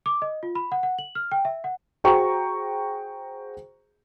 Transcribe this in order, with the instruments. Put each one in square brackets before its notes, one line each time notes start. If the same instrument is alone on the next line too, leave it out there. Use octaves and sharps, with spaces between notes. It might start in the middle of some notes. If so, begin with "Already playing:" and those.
[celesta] D6
D#5
F4
B5
F#5
F#5
F#7
F6
G5
E5
F#5
[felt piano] F#4 G#4 C5 G5 A#5 C#6